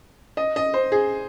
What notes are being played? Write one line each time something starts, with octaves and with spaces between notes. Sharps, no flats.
D#5
D#5
C5
G#4